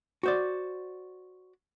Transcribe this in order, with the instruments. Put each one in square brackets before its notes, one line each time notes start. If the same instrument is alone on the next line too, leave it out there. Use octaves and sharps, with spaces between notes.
[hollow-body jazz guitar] F#4 C5 D5